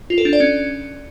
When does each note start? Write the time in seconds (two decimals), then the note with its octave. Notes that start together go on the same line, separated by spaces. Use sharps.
0.10 F4
0.18 A4
0.25 D4
0.33 D5
0.40 C#4